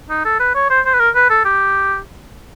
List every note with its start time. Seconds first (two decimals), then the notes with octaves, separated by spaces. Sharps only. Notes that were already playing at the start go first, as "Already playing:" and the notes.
0.10 D#4
0.25 A4
0.40 B4
0.55 C#5
0.70 C5
0.85 C5
0.94 B4
0.99 A#4
1.15 B4
1.30 A4
1.45 G4